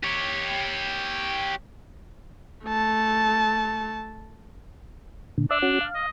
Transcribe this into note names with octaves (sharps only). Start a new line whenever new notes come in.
G4 C#5
A3 A5
A#2 D3
D4 D5 E5
C#4 F#4
F5
D#5